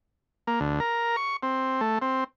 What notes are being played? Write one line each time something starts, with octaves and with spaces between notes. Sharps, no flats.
A#3
D2
A#4
C#6
C4
A3
C4